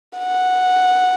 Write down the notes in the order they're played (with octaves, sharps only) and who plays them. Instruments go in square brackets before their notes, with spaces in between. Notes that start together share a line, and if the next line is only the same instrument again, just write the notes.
[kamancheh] F#5